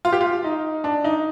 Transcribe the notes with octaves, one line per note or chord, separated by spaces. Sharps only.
F4
G4
F4
D#4
D4
D#4